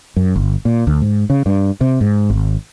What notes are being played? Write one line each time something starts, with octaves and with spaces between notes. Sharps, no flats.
F#2
G1
A#2
D2
G#2
C#3
G2
C3
G#2
G#1